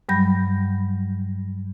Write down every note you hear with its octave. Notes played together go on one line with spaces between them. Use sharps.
G2 F#3 G3 B5 G6 A#6